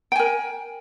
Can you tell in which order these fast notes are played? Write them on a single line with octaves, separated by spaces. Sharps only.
G5 G#5 A#4